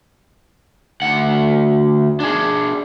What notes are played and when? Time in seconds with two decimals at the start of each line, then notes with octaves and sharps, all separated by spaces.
1.02 D2 F#5
2.20 D4 G#4